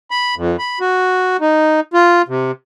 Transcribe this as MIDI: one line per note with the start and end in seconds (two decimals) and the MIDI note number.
0.11 0.35 83
0.36 0.56 41
0.59 0.79 83
0.80 1.37 66
1.41 1.80 63
1.94 2.22 65
2.28 2.51 48